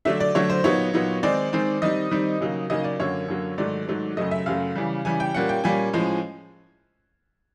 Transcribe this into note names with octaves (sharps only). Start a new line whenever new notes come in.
D3 F#3 A3 D4 E5
D5
D3 F#3 A3 D4 C#5
C5
A#2 F#3 B3 D#4 C#5
A#2 F#3 B3 D#4
D#3 G#3 C4 D#4 D5
D#3 G#3 C4 D#4
D#3 G3 C4 D#4 D#5
D#3 G3 C4 D#4
C#3 F#3 A#3 D#4
C#3 F#3 A#3 D#4 D#5
D5
F#2 D3 F#3 A#3 C#5
F#2 D3 F#3 A#3
G#2 D#3 F#3 A3 D5
G#2 D#3 F#3 A3
F#2 C#3 F#3 A3 D#5
E5
F#2 C#3 F#3 A3 F5
C#3 E3 G3
C#3 E3 G3 G#5
G5
A#2 G3 A#3 C#4 F#5
G5
A#2 G3 A#3 C#4 G#5
A2 F3 G#3 C#4